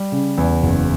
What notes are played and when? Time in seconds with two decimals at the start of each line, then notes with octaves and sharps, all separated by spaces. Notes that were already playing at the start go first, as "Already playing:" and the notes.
Already playing: G3
0.12 C#3
0.38 E2
0.63 F#1